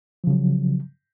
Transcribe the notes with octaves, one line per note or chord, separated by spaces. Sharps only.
C#3 F3 F#3